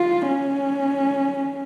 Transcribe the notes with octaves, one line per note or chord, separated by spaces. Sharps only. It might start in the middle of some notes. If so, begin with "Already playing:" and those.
Already playing: F4
C#4